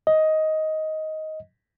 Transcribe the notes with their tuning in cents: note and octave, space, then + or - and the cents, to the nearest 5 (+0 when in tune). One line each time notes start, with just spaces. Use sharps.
D#5 +10